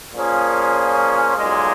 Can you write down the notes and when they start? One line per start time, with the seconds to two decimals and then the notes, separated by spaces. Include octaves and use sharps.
0.14 A#2 F3 A#3 C#4 G#4
1.37 B1 A#2 G#3